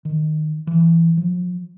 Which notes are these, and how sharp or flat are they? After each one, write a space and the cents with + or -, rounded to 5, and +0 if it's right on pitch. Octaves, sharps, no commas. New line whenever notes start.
D#3 -15
E3 +15
F3 +40